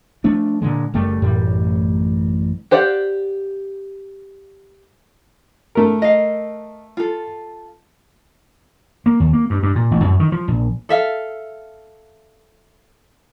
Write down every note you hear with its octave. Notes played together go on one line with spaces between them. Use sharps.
F3 A3 D4
A#2 D3 G#3
F#1 F#2 G3 A3
A1 F#2 A2 G3
G4 C5 D5 F5 F#5
A3 A#4
D#5 F5
F4 A4
A#3
D#2
A#3
G2
G2
A#2
A1
F#2
D#3
F3
A#1
A4 E5 F5